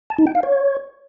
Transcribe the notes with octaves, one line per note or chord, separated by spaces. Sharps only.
A5
D#4
G5
F5
C#5